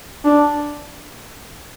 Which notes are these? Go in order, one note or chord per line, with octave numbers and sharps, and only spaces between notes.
D4